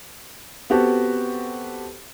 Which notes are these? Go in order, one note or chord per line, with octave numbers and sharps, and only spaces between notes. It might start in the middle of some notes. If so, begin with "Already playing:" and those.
B3 C4 F#4 G4 A4 C5